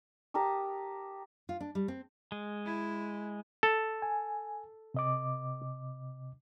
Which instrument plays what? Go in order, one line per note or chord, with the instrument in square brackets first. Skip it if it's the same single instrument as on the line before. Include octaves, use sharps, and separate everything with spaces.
[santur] G4 A#4 A5 D#6
[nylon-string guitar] F4
D4
G3
C4
[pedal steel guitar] G#3
[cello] E4
[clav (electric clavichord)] A4
[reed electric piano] G#5
C3 D#5 D6